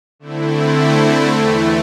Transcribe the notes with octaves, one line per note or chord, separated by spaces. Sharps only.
D3 A3 C4 E4
E2 E3 A3